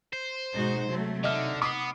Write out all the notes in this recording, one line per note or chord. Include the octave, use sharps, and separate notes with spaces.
C5
G#2 B2 G#3 D#4 F#4
C3 F#3 A3 C4
D3 D#4 D#5 E5 F6
B3 D6 D#6 C7